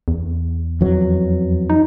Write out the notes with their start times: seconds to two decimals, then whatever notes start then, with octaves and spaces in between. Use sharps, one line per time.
0.08 E2
0.81 F2 E3 F#3
1.70 D#4